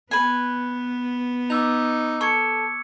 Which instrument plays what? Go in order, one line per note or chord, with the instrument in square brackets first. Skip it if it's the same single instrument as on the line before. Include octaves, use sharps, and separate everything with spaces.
[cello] B3 [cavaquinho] B4 G#5
[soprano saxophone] D#4 [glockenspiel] D6 E6 F7
[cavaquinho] A4 [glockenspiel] C#6 G#6 C#7